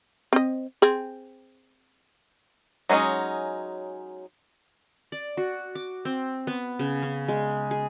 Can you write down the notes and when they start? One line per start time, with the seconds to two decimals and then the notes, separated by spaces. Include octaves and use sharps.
0.33 C4 D#5
0.82 C4 G#4
2.89 F#3 G#3 B3 C#4 D#4
5.12 D5
5.37 F#4
5.75 D6
6.05 C4
6.47 B3
6.79 C#3
7.03 C#4
7.28 G#3
7.71 G#4